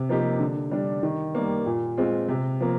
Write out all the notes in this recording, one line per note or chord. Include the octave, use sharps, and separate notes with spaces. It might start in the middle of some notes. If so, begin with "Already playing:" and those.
Already playing: C3
F3 A#3 D#4 G4
D3
G3 D4
D#3
G3 A#3
A#2
G#3 C4 F4
C3
F3 A#3